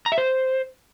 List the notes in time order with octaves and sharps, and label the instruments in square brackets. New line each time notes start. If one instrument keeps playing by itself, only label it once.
[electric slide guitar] A#5
E5
C5